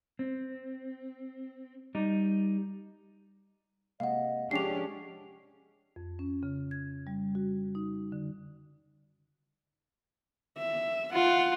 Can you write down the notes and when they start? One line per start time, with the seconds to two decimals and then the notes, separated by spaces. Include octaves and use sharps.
0.19 C4
1.95 G3 D#4
4.00 C3 G#3 A#3 D#5 F5 F#5
4.51 F3 G#3 C#4 D4 G4 G#4 C7 F7
5.96 F2
6.19 C#4
6.43 C#3
6.71 G#6
7.07 G3
7.35 F#4
7.75 D#4
8.12 D3
10.57 E5
11.14 F4 F#5